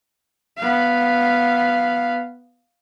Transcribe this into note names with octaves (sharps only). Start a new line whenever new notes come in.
B3 F5